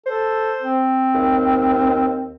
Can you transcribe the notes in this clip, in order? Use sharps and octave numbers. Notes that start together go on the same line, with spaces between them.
A4 C5
C4
D#2